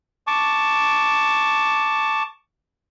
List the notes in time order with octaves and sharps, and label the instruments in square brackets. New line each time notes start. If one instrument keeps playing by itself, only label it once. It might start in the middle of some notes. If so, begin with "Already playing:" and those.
[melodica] A5 C#6 D6